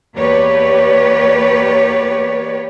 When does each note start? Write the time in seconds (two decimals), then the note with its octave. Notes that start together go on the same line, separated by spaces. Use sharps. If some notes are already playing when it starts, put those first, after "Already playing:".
0.16 E2 A#3 G4 B4 C#5 D5